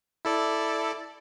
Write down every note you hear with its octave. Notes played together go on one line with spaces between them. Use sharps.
E4 A4 D5